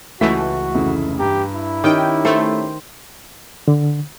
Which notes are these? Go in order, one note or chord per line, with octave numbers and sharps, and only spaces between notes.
C#2 E3 A3 F#4 B6
F1 C#3 E4
G2 G4 A#5
E4
D#3 C#4 D#4 G4 G5
A3 C5
D3